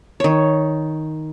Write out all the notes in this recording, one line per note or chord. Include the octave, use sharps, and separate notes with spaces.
D#3 C#5